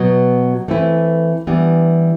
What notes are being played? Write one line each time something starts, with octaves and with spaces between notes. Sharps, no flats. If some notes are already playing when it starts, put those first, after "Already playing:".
Already playing: B2 F#3 B3
E3 A3 C4 E4 B4
E3 G3 B3 D4